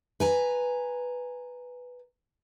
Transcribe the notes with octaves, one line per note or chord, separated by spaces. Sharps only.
B4 G#5 A#5